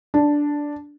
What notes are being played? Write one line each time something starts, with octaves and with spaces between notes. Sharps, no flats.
D4